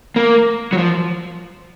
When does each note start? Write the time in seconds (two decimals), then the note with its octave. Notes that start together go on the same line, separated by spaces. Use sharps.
0.16 A#3
0.73 F#3
0.78 F3